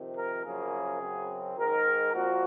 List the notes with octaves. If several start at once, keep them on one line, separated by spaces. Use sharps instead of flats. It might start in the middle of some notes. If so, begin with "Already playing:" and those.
Already playing: F2 C3 D#3
A#4
F#2 C#3 F3 A#3 G#4
F#2 C#3 F#3 C4
G#2 D#3 G#3 A#4
A#2 F3 C4 F#4